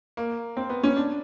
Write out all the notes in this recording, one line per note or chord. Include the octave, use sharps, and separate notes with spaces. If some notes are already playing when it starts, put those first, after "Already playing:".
A#3
C4
B3
C#4
D4